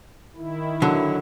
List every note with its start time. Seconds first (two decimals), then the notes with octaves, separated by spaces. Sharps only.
0.36 D#3 E4
0.82 D3 F#3